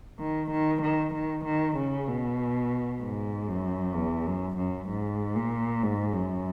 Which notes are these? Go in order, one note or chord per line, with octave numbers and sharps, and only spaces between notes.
D#3
D#3
D#3
D#3
D#3
C#3
B2
G#2
F#2
E2
F#2
F#2
G#2
A#2
G#2
F#2